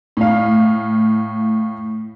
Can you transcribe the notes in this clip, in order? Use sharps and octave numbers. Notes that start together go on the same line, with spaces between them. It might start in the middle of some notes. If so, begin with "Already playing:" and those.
A2 F5